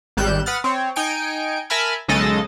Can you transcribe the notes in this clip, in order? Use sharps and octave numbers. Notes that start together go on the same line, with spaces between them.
G#1 G3 F#6 G6 E7
B4 F#5 D#6 F6 A6
C4 C#5
D#4 G5 G#5 C#7 D7
A#4 E5 G#5 A5 B5 F6
B1 C#3 G#3 A4 D#5 A6